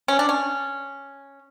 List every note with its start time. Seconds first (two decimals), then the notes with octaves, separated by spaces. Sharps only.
0.08 C#4
0.19 D4
0.29 C#4